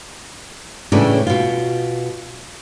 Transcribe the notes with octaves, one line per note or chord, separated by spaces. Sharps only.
A2 C#3 E3 C#4 D4
B2 F4